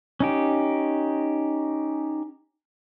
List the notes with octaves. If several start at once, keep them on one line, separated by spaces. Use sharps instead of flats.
C#4 D#4 G4